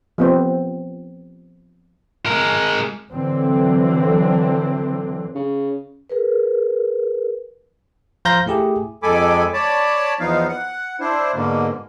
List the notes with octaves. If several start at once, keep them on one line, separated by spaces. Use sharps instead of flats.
F3 B3 C4
G#3 A#4
D3 E3 F#3 C4
C#3
G#4 A#4 B4
F3 C5 F5 A#5 G6 A#6
A3 E4 G4 G#4
F2 G#3 A4 G#5 B5 D6
C#5 D5 A5 B5
E2 F3 B3 D#4 F5
F#5
D4 E4 C5
G#2 B2 D3 A#3